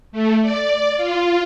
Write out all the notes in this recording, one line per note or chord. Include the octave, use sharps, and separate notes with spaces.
A3
D5
F4